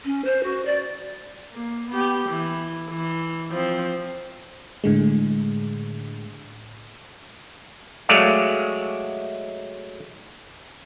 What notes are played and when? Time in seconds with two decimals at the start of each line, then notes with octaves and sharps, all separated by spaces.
0.05 C#4
0.25 C5
0.44 F#4
0.65 D5
1.53 A#3
1.90 B3 G4
2.30 E3
2.90 E3
3.51 F3 C4
4.84 A2 D3 G#3
8.09 F#3 G#3 A3 D5 F5